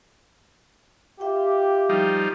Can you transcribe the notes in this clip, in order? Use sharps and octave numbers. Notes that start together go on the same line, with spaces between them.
F4 G4 E5 G5 D6
F3 G3 D#4